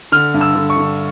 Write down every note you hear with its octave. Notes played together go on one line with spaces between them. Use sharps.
D3 F6
G2
E6
D3
C#6
D3